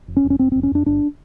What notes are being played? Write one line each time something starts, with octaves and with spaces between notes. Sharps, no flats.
F1
C#4
F1
C#4
F1 C4
F1 C4
C#4
F2 D4
G1 D4